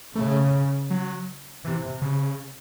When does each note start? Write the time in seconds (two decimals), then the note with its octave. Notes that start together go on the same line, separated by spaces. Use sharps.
0.15 C#3 A3
0.90 F#3
1.65 C3 E3
2.02 C#3